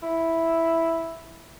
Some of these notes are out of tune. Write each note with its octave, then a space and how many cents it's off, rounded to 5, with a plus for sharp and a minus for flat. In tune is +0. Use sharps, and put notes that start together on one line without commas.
E4 +0